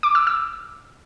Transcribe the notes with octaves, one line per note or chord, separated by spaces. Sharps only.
D6
E6
E6